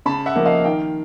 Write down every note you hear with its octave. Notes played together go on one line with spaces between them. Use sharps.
C#3 A5 B5
E5 F#5
F3 A#3
D#5 F5
D#3 F5 G5